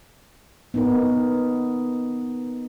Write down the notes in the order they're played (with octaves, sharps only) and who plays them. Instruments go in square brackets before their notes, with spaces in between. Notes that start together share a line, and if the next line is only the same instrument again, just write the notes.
[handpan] B3 D#4 A#4